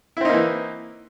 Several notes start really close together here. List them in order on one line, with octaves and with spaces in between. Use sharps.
E4 C4 D#4 A#3 E3